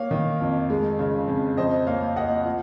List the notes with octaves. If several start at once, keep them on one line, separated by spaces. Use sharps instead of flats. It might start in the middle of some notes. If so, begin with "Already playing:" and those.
Already playing: A#3 C#5 F5
D#3
F2
G#3
C#3
F2
F2 C5 D#5
A#3 C#5 F5
A#3 D#5 F#5
F3